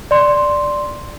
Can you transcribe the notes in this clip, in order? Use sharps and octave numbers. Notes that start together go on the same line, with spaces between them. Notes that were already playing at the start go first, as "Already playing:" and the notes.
D5 C6